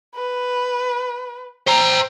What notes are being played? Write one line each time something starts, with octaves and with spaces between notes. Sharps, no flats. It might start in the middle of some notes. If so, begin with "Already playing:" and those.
B4
C5 G5 A#5